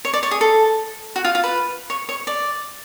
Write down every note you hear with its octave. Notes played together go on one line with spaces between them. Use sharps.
C#5
D5
C#5
G#4
A4
F#4
F4
F4
B4
C#5
C#5
D5